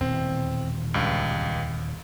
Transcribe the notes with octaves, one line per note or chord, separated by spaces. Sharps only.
D#1 E2 B2 C4
C#2 G2